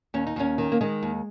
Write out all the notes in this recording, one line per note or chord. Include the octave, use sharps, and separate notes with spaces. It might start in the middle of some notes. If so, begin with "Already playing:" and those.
D#2 C#4
D#4
D#2 C#4
D#3
A#3
D#3 G#3
D#2